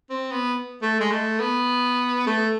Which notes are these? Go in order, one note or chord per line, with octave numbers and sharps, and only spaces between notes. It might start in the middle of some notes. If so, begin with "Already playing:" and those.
C4
B3
A3
G#3
A3
B3
A3